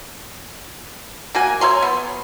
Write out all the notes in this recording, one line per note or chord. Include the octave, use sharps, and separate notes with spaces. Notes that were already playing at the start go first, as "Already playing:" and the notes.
A#3 F#4 G#5
C#5 E5 A#5 C6
B3